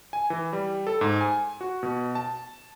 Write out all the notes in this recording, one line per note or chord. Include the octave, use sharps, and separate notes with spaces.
G#5
E3
G3
A4
G#2
G#5
F#4
B2
A5